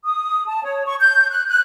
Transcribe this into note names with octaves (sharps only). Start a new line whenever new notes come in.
D#6
A5
C#5
C#6
G6
F#6
F#6